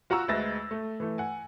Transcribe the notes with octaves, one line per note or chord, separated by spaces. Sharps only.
F4 F#4 F#5 A#5 C#6 E6
D2 G#3 B4 E5 A6 A#6
A3
E3 A3
F#5 G#5